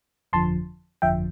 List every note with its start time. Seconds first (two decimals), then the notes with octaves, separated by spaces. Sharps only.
0.33 G1 F2 D3 F3 A5 C6
1.02 G1 F2 D3 F3 E5 G5